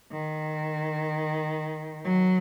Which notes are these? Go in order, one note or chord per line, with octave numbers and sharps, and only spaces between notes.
D#3
F#3